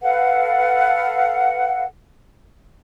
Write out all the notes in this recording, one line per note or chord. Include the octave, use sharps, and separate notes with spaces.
A4 B4 F5 F#5